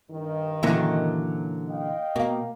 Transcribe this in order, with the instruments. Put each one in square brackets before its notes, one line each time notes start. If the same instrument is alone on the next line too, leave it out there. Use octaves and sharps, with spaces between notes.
[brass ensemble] G2 D#3
[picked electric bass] A#2 E3 A#3 [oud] D3 F#3 C#4
[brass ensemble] D#5 F5 G5
[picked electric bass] B2 [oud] A#3